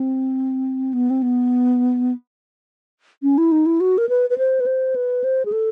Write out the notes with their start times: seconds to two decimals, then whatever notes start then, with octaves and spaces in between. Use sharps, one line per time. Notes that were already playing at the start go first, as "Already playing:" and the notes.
Already playing: C4
0.93 B3
1.10 C4
1.22 B3
3.23 C#4
3.38 E4
3.52 D#4
3.66 E4
3.80 F#4
3.98 A#4
4.09 B4
4.30 B4
4.38 C5
4.60 B4
4.66 C5
4.96 B4
5.24 C5
5.45 G#4
5.52 A4